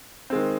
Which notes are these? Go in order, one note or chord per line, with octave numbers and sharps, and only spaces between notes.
D#3 G#3 C4